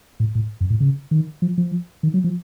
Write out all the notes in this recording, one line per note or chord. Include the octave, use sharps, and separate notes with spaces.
A2
A2
F#2
A2
C#3
D#3
F3
F3
D#3
F#3
F3